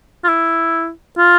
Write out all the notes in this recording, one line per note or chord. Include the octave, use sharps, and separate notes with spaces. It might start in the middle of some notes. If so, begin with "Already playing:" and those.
F4
E4
F4